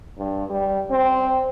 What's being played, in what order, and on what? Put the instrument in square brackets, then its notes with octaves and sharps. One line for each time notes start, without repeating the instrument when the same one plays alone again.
[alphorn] G2
G3
C4